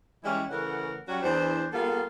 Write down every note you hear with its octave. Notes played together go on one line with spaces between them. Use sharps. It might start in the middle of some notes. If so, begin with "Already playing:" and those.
E3 G3 G#3 C#4 E4
C#3 E3 A3 A#4 F#5
F#3 G3 C#4 F#4
E2 E3 D4 C5
G3 A#3 B3 F4 G#4 A4